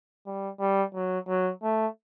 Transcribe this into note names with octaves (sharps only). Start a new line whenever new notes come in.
G3
G3
F#3
F#3
A3